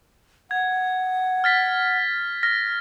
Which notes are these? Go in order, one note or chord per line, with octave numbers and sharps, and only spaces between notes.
F#5 G#6
F6 A6 B6
F6 A#6